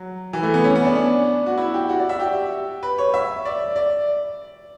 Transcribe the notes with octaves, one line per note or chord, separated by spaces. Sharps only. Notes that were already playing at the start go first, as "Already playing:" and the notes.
Already playing: F#3
E3
A3
B3
C#4
B3
D4
D4
F#4
E4
G4
F#4
D5
E5
G4
B4
C#5
E5
D5
D5